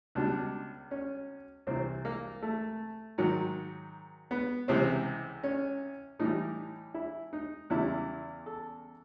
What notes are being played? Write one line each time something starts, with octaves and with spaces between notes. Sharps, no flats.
C#2 B2 G3 D4
C#4
C2 C3 E3 C4
A#3
A3
G#2 D#3 F#3
B3
C#2 C3 E3 C4
C#4
A2 E3 G3 D#4
E4
D#4
E2 C#3 E3 G3 E4
A4